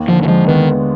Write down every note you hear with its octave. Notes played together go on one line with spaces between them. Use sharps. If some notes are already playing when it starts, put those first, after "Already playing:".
Already playing: D#2
D3 F3
D#3
F3 G#3
D#3 B3